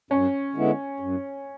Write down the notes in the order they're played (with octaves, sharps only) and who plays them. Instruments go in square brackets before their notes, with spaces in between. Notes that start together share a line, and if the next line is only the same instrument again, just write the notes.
[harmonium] F#2 [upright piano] C#4
[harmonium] D3 G#3 B3 E4
F#2